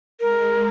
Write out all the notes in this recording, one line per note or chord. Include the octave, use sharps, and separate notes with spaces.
G#3 A#4